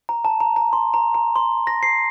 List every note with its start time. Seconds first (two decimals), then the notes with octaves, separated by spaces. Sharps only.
0.09 A#5
0.25 A5
0.40 A#5
0.56 A#5
0.73 C6
0.94 A#5
1.15 A#5
1.36 C6
1.67 A#6
1.83 C7